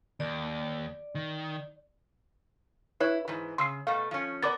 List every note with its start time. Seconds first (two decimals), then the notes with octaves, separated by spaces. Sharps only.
0.20 D#2 D5
1.15 D#3
3.00 E4 B4 C#5 F#6
3.28 G#2 E3
3.58 C#3 C6 E6 C7
3.87 B2 A3 F5
4.11 F3 C#4
4.43 B3 A#4 D5 D6 A6